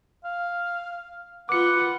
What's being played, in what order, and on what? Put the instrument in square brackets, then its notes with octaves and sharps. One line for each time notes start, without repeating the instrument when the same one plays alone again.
[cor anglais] F5
[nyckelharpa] F4 B4 [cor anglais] F#5 [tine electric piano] D6 C#7